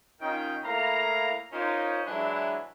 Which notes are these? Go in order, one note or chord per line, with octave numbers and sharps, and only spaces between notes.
D#3 C#4 D#4 F4 G5
A2 A#3 E4 F5 A#5
C#4 D#4 F4 A#4 C5 C#5
E3 F#3 G#3 D4 E4